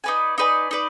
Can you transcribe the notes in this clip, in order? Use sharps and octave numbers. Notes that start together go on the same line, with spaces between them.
D#4 B4 D5 G#5
D#4 B4 D5 G#5
D#4 B4 D5